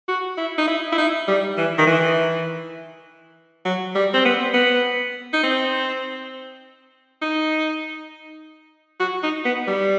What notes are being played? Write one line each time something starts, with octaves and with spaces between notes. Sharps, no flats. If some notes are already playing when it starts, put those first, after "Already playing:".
F#4
E4
D#4
E4
E4
D#4
G3
E3
D#3
E3
F#3
G3
C4
B3
B3
D#4
C4
D#4
F#4
D#4
B3
G3